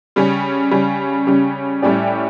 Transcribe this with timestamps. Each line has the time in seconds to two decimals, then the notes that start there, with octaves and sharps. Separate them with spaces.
0.16 C#3 G3 C#4
0.71 C#3 G3 C#4
1.27 C#3 G3 C#4
1.82 A2 G3 C#4 G4 D5